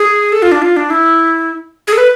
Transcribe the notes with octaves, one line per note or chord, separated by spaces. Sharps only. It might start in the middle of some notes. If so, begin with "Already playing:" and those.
Already playing: G#4
A4
F4
D4
F4
D4
E4
G#4
A4
B4